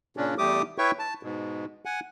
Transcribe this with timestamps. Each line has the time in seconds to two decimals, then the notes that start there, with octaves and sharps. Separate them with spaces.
0.17 A#2 C#3 C#4 D4
0.38 E2 G3 A3 G4 D6 D#6
0.78 E4 B4 C#5 E5 G5 C#6
0.99 A5
1.23 G#2 B2
1.85 F#5 G#5